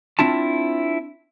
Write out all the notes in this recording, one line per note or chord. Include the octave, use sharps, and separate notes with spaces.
C4 D4 E4 F4 A5